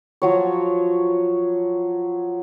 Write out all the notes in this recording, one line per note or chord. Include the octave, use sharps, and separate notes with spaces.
F3 F#3 C#5